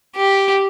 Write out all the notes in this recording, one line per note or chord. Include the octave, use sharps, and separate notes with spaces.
G4